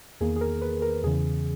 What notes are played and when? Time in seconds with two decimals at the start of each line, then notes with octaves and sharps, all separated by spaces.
0.21 E2 D#3 A#3 G#4
0.36 G#4
0.41 A#4
0.62 B4
0.82 A#4
1.03 E2 C#3 E3 G#4